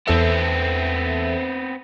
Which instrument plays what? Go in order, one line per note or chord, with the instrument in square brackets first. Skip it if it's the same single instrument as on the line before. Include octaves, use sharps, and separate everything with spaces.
[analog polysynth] E2 A4 E5 [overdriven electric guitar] B3 C4